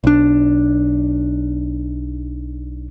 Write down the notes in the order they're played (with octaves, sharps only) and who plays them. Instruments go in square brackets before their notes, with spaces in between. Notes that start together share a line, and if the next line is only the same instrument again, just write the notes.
[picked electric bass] B1 D4